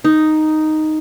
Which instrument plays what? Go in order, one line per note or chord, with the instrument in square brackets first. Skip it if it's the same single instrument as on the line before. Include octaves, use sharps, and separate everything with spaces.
[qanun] D#4